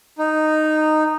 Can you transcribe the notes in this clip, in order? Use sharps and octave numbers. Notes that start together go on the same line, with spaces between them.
D#4